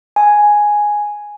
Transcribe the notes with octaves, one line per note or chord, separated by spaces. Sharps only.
G#5